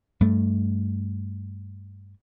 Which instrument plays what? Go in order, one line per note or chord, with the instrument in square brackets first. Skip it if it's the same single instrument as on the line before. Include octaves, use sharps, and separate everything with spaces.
[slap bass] G2 A3